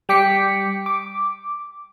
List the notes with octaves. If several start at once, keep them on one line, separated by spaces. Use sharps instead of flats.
G3 G5 D6 B6 C#7
D6